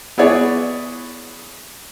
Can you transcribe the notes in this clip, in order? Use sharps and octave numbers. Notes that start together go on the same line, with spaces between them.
B3 E4 G#4 C#5 D5